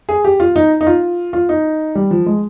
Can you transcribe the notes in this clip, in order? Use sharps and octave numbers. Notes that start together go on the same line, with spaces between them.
G#4
G4
F4
D#4
D#4
F4
F4
D#4
G3
F3
G#3